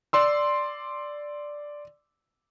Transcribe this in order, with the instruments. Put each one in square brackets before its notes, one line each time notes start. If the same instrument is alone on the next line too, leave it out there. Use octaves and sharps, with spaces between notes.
[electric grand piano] D5 C6 E6